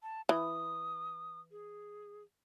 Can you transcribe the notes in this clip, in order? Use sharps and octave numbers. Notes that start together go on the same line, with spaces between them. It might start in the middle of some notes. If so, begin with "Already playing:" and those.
A5
E3 D#6
G#4